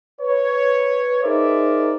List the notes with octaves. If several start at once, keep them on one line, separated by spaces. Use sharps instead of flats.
B4 C#5
D#4 G#4 A#4 C5 D5 E5